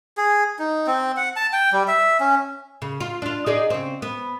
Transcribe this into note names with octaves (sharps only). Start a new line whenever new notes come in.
G#4
D#4
C4
F#5
A5
G5
G3
E5
C#4
C#3
F4
D4 F4
D#4 G#4 D5
C#3 C4
B3